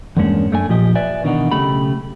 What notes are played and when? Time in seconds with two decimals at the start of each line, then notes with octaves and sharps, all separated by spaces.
0.17 E2 G2 G#3 A#3 C#4 D4
0.51 F#2 A3 D4 C#5 G#5
0.69 A#2 F3 G4 D#5
0.95 B4 D5 E5 G#5
1.24 B2 D#3 E3 D4 D#4 F#4
1.52 B1 C#3 A3 G4 B5